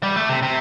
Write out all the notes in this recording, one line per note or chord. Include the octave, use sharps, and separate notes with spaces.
G3
A3
C3
C3